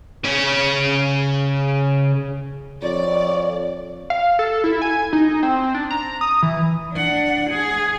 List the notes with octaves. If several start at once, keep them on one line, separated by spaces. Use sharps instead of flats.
C#3 C#4
F2 C#5 D5
F5
A4
E4
G#5
D#4
C4
D4
A#5
D#6
E3
D4 F#5
G#4